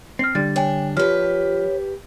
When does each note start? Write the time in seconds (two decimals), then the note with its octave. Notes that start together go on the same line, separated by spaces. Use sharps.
0.19 C4 F6 C7
0.35 D3 G3 A6
0.56 D4 C#5 G5 G#5
0.97 F3 G4 B4 C#5 F6